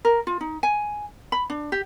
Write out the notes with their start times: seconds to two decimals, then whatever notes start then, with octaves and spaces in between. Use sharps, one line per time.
0.05 A#4
0.27 F4
0.41 D#4
0.63 G#5
1.32 B5
1.50 D4
1.72 G4